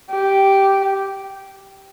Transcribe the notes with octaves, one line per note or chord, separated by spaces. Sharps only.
G4